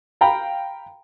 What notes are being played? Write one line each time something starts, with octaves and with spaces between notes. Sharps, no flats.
F5 G5 A#5 B5